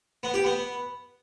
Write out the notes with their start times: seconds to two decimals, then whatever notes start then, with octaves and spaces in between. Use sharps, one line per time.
0.23 B3
0.34 G4
0.44 B3